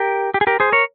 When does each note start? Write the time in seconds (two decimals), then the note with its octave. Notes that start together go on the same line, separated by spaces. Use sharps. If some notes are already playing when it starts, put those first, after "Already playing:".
Already playing: G4 A#4
0.34 G4
0.41 G#4
0.47 G4 A#4
0.60 G#4 C5
0.72 A#4 C#5